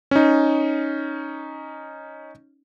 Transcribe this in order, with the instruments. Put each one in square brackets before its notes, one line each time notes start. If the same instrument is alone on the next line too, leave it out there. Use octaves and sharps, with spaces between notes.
[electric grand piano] C#4 D#4